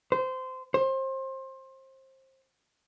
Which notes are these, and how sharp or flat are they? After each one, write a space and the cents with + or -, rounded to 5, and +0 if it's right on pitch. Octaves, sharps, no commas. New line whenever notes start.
C5 -20
C5 +25